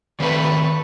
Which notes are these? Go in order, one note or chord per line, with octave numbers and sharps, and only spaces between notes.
D#3 A3 C4 B4 D5